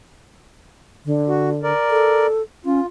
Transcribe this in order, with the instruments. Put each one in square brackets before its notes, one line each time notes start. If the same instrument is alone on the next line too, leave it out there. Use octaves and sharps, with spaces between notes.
[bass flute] D3
[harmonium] F#4
A#4 D5
[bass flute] A4
[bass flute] C#4 [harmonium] F4